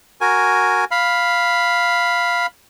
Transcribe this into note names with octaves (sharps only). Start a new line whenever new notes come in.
F#4 A#4 G#5
F5 B5